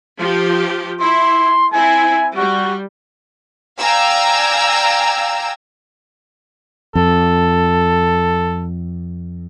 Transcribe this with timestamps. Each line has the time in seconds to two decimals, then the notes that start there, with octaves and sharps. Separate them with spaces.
0.19 F3 G4
1.00 E4 C6
1.73 C4 E4 G#5
2.37 G3 F#4
3.80 D5 F5 G5 G#5 A#5 E6
6.95 F2 A4